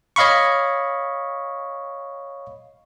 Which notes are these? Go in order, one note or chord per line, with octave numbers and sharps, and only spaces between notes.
C#5 D#5 F5 B5 C#6